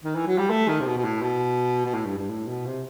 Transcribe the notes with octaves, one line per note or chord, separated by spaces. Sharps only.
D#3
E3
F#3
G3
A3
D#3
C3
B2
B2
A2
B2
B2
A2
G2
G2
A2
B2
C3